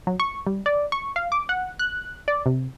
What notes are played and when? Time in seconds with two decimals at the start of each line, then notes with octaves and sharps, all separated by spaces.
0.07 F#3
0.20 C#6
0.47 G3
0.66 D5
0.92 C#6
1.16 F5
1.32 D6
1.49 F#5
1.79 F#6
2.28 D5
2.46 C3